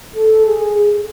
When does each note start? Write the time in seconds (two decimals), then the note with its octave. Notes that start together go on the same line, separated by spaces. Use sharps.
0.16 A4
0.46 G#4